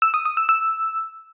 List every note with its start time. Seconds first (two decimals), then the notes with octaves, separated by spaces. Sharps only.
0.02 E6
0.14 D#6
0.25 D#6
0.37 E6
0.49 E6